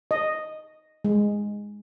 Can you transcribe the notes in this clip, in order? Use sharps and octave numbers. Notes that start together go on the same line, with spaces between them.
D#5
G#3